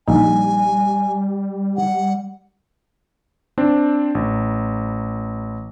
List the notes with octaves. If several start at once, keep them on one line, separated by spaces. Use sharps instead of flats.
A#1 G3 D#4 G#5
F#5
C4 D4
A1